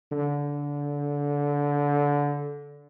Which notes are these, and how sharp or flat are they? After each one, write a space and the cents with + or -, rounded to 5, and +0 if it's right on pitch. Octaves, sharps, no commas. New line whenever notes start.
D3 -20